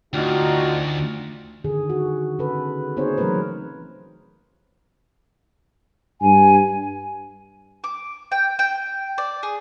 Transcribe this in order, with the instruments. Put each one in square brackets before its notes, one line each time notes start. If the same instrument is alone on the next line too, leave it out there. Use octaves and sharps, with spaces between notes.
[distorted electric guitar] D2 [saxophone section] C4 D4 F4 [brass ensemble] D#4 F#4
[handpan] D3 D#3 G#4
F#4
C#3 A4 B4
A#3 C4 D#4 G#4 C5 C#5
E3 F#3 A3 A#3 A#4 B4
[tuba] G2 [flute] G#5
[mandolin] D6
G5
G5
D5
G#4